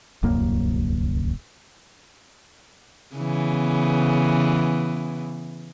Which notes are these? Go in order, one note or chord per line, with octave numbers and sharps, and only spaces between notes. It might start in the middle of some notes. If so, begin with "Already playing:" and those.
D1 C2 F#2 A#3
C#3 E3 B3